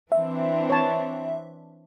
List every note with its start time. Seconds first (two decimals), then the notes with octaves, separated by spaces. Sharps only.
0.12 E3 C4 D4 E5
0.70 C#5 A5